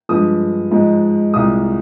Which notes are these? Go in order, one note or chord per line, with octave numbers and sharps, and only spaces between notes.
G2 F3 G#3 D#6
G#2 F3 G#3
C2 A#2 G#3 D#6